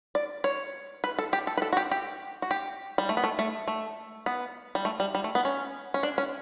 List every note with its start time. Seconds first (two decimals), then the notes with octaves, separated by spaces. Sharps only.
0.15 D5
0.44 C#5
1.04 B4
1.19 A4
1.33 G4
1.47 A4
1.57 B4
1.62 A4
1.73 F#4
1.77 G4
1.91 G4
2.42 F#4
2.51 G4
2.98 G3
3.09 A3
3.17 B3
3.24 A3
3.39 A3
3.68 A3
4.26 B3
4.75 G3
4.85 A3
5.00 G3
5.15 G3
5.24 A3
5.35 B3
5.45 C#4
5.94 C#4
6.03 D4
6.18 C#4